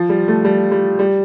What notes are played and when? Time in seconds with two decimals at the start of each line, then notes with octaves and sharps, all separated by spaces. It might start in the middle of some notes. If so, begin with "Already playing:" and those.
Already playing: F3
0.09 G3
0.28 A3
0.45 G3
0.71 G3
0.99 G3